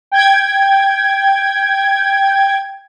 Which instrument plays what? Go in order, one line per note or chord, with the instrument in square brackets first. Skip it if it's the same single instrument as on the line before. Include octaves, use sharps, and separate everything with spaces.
[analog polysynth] G5 G#6